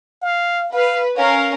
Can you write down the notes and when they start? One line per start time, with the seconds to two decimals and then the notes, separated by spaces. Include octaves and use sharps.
0.22 F5
0.73 B4 F5
1.17 C#4 A#4 F5